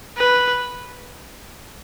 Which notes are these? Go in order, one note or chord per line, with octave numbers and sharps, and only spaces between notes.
B4